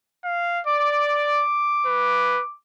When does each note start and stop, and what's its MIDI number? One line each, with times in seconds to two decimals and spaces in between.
0.25 0.61 77
0.67 1.44 74
0.67 2.55 86
1.86 2.42 71